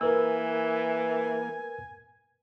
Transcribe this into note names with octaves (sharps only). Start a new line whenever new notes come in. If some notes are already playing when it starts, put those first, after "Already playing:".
E3 A#3 A#4 B4 G#5 E6